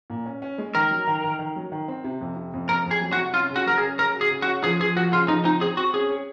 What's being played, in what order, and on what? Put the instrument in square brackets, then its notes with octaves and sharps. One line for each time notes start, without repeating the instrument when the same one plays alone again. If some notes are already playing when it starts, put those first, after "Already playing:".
[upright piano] A#2
C#4
C#4
G#3
[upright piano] D#3 [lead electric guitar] A#4
[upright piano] F#3
D#3
D#3
D#3
F#3
D#3
C4
C3
F2
C3
F2
[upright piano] F2 [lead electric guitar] A#4
[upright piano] F2 [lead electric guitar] G#4
[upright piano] F#3
[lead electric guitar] F#4
[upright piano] C3
[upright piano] C#4 [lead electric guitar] F4
[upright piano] C#3 [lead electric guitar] F#4
[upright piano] F#3 [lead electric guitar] A#4
[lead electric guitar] G#4
[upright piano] C#4
[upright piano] C#3 [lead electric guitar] A#4
[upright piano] F#4
[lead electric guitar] G#4
[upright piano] C#3
[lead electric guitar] F#4
[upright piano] C#4
[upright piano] F3 [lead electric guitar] G#4
[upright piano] F3 [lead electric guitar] G#4
[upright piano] F3 [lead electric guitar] F#4
[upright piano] C#3 [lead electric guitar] F4
[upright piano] F3 [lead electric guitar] D#4
[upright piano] C4 [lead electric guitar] D#4
[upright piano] C4 [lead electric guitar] G#4
[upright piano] C4 [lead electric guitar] F#4
[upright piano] C#4 [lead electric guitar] G#4
[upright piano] C#5